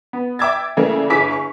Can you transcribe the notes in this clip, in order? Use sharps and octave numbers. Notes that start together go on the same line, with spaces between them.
B3
E5 G5 D6 E6 G#6 A6
C#3 E3 G3 A3 A#3
G1 E4 G#4 G#5 D6 B6
C#6